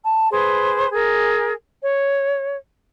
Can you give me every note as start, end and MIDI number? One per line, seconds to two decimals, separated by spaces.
0.03 0.28 81
0.31 0.89 68
0.31 0.89 71
0.31 0.89 72
0.92 1.53 68
0.92 1.53 70
1.82 2.56 73